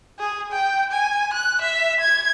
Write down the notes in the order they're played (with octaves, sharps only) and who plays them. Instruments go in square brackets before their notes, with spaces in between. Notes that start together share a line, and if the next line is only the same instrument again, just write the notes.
[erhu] G#4
G5
G#5
F#6
E5
G#6